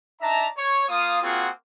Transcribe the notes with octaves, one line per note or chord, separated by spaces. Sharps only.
D4 D#4 E5 A5 A#5
C#5
A#3 F4 F5 D#6
A#3 C4 F4 F#4 G#4 F#5